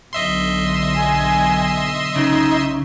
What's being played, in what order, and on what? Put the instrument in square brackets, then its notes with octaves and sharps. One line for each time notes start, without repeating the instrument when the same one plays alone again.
[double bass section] B1 D3 [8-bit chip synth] D#5 E5 C6
[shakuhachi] G#5
[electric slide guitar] C#3 [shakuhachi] D#4